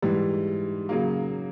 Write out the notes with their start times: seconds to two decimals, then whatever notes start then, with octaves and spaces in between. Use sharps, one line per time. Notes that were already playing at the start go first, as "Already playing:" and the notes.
0.02 G#2 E3 G3
0.89 C#3 F#3 A#3